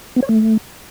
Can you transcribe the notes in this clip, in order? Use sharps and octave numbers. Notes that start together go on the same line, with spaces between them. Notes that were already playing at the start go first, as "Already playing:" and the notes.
B3
C#5
A3